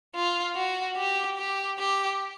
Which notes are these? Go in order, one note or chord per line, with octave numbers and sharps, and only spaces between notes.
F4
F#4
G4
G4
G4